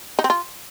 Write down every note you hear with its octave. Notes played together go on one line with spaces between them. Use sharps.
D#4
C4
F4